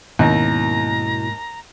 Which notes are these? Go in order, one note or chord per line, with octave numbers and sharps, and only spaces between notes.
D#2 G#2 B2 A#3 C#4 E4 A#5